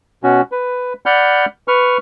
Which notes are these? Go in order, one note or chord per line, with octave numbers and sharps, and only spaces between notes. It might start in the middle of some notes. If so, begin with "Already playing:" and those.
B2 C#4 F#4
B4
D5 F#5 B5 F6 G6
B4 C#6 F6